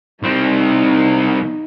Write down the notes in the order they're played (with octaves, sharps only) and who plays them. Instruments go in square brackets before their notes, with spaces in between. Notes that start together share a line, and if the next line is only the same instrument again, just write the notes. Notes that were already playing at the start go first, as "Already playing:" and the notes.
[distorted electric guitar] C2 C4 [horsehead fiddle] D#4